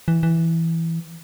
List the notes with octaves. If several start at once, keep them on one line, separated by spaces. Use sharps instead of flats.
E3
E3